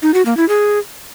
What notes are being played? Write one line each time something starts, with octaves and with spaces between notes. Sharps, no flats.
D#4
F#4
A#3
E4
G#4